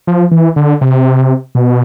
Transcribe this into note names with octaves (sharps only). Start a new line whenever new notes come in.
F3
E3
D3
C3
B2